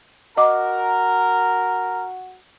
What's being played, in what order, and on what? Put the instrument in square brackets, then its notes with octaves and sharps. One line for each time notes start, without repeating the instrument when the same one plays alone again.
[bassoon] F#4 [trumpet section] A#4 [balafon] D#5 D6